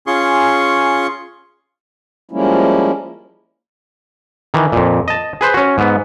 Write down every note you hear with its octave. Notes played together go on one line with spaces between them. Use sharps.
C#4 F4 G#4 C6 C#6
F3 G3 G#3 A#3 C#4 E4
D#3 E3
F2 A#2
D#5 A5
G#4 B4 C5
C#4 F#4
G#2 B3